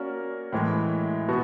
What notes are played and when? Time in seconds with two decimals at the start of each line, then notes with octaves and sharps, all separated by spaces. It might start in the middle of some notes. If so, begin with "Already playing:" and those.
Already playing: A#3 C#4 F#4 A#4 D5
0.53 A2 E3 G#3
1.28 B2 B3 F#4